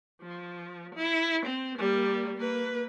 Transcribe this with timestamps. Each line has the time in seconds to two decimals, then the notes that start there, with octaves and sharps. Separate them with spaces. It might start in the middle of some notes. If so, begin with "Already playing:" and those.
0.22 F3
0.95 E4
1.46 C4
1.78 G3 A#3
2.37 A#3 B4